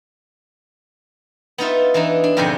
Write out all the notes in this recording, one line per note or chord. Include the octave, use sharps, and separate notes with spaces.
B3 D#4 F4 E5
E3 D4 D#4
D4
F2 G#2 B2 D3 G4 G#5